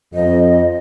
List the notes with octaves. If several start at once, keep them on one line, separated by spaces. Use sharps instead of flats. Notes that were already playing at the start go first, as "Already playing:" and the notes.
F2 D#5